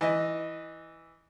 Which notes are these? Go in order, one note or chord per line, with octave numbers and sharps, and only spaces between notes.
E3 D#5